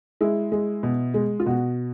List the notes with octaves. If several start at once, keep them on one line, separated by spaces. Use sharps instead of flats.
G#3 E4
G#3
B2
G#3
F4
B2 F#4